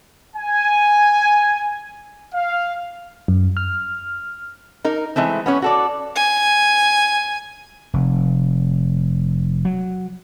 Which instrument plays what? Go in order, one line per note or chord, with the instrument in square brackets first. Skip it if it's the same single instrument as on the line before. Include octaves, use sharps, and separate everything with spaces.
[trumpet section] G#5
F5
[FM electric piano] F#2
F6
[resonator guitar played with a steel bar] D#4 A#4
E3 G#3 A3 C4
B3 C#4 C#5
F#4 A4 D5
[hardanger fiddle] G#5
[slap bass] F1
F#3